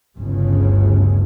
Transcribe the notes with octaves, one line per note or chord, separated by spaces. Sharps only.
G1 D2 C#3